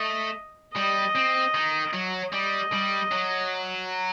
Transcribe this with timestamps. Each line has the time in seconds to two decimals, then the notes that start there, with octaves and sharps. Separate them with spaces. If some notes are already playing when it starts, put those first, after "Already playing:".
Already playing: A3 D#5
0.76 G3 D#5
1.15 C4
1.54 D#3
1.93 F#3
2.33 G3 D#5
2.72 G3
3.11 F#3